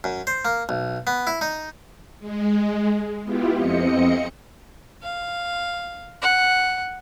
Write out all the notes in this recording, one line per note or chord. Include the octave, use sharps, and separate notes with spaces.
F#2
C5
A#3
B1
B3
E4
D#4
G#3
B3 E4 F4 G4
F2 C4 D#5 C#7
F5
F#5